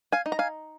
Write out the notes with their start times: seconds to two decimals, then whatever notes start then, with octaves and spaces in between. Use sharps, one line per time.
0.12 F5 G#5
0.26 D#4
0.32 A#5
0.39 F5 G#5